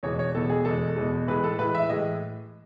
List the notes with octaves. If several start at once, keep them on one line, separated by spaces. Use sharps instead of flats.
E2 B2 G#3 C#5
C#5
E2 B2 G#3 A4
G#4
E2 B2 G#3 A4
E2 B2 G#3
A2 E3 G#3 B4
A4
A2 E3 G#3 B4
E5
A2 E3 G#3 D#5